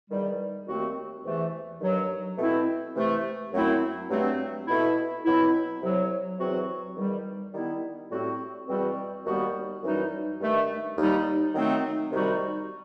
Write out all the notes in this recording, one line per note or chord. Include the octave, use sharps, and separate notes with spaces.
E2 D#3 G3
D#2 D#3 A3 C4 F#4
E2 C3 E3 A3
G2 D#3 F#3
B2 A3 C4 E4
C3 E3 A3
F#2 F#3 A3 C4 E4
G2 F#3 A3 C4
B2 A3 E4
B2 F#3 C4 E4
C2 C3 F#3
E2 C3 F#3 C4 F#4
E2 D#3 G3
D#3 G3 B3 E4
A2 G3 C4 F#4
E2 B2 G3 C4 F#4
D#2 D#3 G3 B3 F#4
F#2 E3 G3 D#4 F#4
G2 D#3 A3
D#2 D#3 G3 D#4
D#3 F#3 A3 C4 D#4
C3 D#3 G3 D#4 F#4